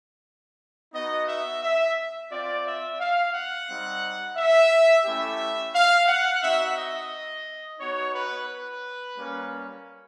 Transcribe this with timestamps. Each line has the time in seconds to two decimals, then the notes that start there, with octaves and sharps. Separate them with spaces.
0.94 B3 D#4 F#4 D#5
1.28 E5
1.63 E5
2.30 C4 F4 D5
2.65 E5
3.00 F5
3.34 F#5
3.68 G3 C4 D#4
4.37 E5
5.05 A3 C#4 E4 G4 E5
5.74 F5
6.08 F#5
6.43 C4 D#4 F#4 E5
6.77 D#5
7.80 B3 D#4 F#4 C#5
8.14 B4
8.48 B4
9.17 G3 A#3 C#4